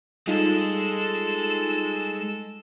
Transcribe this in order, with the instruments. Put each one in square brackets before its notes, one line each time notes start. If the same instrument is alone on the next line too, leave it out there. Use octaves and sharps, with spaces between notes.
[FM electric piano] G3 D#4 F4 [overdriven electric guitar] G#3 [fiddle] A4 E6